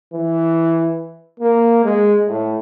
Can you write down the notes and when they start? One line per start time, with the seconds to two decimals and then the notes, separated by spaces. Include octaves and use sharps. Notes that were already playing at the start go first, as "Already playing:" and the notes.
0.14 E3
1.40 A#3
1.84 G#3
2.28 A2